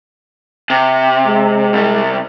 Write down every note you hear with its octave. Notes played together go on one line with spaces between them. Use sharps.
C3
G#3
C2 C3